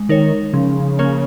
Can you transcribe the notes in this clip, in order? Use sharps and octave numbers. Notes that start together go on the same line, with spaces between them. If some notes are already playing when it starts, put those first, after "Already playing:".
Already playing: G#3
D#3 D#4 A#4 C#5
C#3 F3
A#3 C#4 A#4 C#5